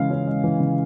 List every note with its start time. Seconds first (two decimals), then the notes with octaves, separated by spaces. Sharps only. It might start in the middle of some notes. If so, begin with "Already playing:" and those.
Already playing: C#3 E3 G#3 F5
0.10 C#4
0.27 G#3
0.44 E3
0.60 C#3